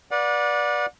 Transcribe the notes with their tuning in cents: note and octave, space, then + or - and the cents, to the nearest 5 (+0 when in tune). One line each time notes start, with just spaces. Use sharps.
B4 -30 D5 +0 F#5 -35